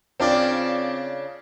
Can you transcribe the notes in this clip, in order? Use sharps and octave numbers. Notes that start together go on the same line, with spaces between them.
C#3 C4 D4 F4 D5